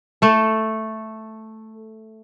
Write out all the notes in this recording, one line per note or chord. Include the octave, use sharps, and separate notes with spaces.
A3 A4